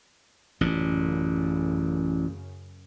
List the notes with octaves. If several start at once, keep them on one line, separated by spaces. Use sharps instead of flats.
A1 F#2 A#2 C#3